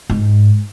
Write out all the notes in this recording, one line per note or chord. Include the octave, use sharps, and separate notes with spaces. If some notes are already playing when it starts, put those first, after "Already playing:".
G#2